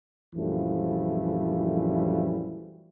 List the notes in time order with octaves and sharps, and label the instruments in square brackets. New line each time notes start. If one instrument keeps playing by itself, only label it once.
[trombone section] A#1 F#2 E3 F3 G3 A3